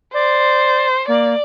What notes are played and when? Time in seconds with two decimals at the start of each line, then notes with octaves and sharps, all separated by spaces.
0.14 C5 D5
1.08 A#3 D5